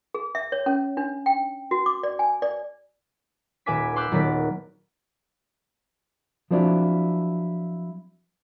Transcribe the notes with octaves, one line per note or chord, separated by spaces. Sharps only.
G#4
E5
C#5
C#4
D4
G5
F#4
D6
D5
G#5
D5
D#1 B4 E5 G#5 D6 B6
B4 C6 D6 E6 F#6 G6
D#1 D#3 F#3 B3 D5 B6
F3 F#3 C4 D4 E4 F4